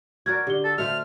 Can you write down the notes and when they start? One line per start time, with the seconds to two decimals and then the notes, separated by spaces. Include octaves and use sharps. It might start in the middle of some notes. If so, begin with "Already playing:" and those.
0.26 F#4 A#4 D5 F6 G#6
0.47 D3 G4 G7
0.64 A4 A6
0.78 A3 F#4 C5 E5 F5 F6